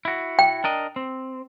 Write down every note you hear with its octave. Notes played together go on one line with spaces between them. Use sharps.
E4 F#4
G5
D4 A#4 D#5
C4